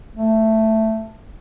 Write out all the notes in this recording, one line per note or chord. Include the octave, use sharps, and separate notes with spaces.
A3